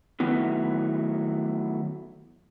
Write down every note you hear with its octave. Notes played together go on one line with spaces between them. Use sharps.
D#3 F#3 A3 B3 E4